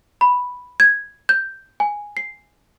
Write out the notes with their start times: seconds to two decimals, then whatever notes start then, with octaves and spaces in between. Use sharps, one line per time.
0.21 B5
0.80 G#6
1.29 G6
1.80 G#5
2.17 C7